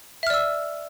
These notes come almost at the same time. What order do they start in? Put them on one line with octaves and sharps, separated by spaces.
E5 F6 D5 E6